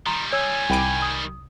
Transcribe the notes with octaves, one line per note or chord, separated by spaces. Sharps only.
D#3 G3 A#5 C6 E7
C#5 G#5 E6
C2 G5 B5 D6 D#7
D#6